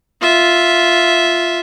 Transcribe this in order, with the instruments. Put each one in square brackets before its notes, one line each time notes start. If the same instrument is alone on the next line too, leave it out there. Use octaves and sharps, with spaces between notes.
[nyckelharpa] F4 E5